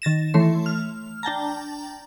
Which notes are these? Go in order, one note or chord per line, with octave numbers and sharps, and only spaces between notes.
D#3 A6 A#6 E7
E3 A3 C#5 C6
F6
D4 G5 A5 A#5